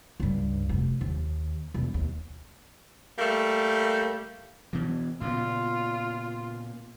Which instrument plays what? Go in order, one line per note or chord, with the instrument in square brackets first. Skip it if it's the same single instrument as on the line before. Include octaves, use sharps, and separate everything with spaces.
[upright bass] C#2 G2
F1
D#2
E1
D#2
[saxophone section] G3 A3 A#3
[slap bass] B2 E3
[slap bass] A#2 C#3 B3 [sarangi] F4